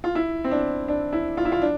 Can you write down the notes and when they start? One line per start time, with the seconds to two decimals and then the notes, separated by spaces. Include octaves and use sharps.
0.04 F4
0.15 E4
0.44 C4
0.51 D4
0.88 D4
1.13 E4
1.37 F4
1.45 E4
1.52 F4
1.62 D4